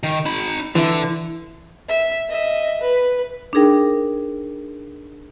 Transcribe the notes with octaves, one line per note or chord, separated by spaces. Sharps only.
D#3
D#4 B5
D3 E3 E4
E5
D#5 E5
B4
D4 D#4 G#4 A#4 G5